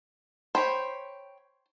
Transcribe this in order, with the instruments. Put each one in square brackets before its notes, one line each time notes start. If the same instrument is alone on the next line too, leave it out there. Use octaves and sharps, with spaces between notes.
[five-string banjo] C5 [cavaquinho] C#5 G5 B5